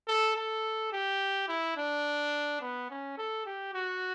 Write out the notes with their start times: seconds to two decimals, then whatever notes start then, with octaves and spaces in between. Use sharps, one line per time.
0.08 A4
0.36 A4
0.93 G4
1.48 E4
1.77 D4
2.61 B3
2.90 C#4
3.18 A4
3.46 G4
3.74 F#4